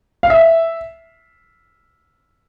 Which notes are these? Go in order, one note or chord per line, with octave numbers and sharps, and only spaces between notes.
F5
E5